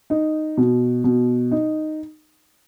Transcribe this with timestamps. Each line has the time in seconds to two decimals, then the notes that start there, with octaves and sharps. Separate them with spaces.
0.10 D#4
0.57 B2
1.04 B2
1.51 D#4